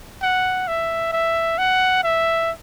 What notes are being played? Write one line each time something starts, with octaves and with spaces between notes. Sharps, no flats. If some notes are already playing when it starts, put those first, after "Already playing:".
F#5
E5
E5
F#5
E5